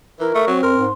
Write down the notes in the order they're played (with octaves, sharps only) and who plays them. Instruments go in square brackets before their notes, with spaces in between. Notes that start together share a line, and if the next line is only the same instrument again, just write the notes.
[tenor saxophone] E3 [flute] E4 [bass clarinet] A#4
[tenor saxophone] A3 [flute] C#6
[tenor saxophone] F#3 [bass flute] C4
[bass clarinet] F2 [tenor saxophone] A#4 [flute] C6
[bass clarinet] G#2